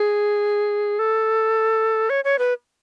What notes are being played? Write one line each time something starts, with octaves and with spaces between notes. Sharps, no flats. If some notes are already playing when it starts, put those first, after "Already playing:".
Already playing: G#4
A4
C#5
C#5
B4